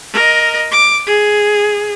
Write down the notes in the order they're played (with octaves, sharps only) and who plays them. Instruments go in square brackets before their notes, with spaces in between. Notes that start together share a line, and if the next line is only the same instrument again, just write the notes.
[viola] A#4 D#5
D6
G#4